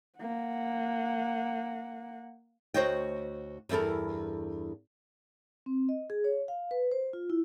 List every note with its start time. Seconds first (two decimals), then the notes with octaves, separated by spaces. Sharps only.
0.19 A#3 F#5
2.74 D2 F#4 C5 C#5 D#5 G5
3.69 E2 G2 E4 A4 A#4
5.66 C4
5.89 D#5
6.10 G#4
6.24 C#5
6.48 F5
6.71 B4
6.92 C5
7.13 F4
7.30 E4